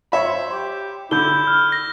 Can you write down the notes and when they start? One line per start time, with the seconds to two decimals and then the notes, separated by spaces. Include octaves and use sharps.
0.12 C#5 E5 B5
0.26 C5
0.52 G4
1.11 D3 E4 G6 G7
1.47 F6
1.72 A#6